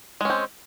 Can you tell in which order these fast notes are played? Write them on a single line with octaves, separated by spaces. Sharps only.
G#3 C#4 C4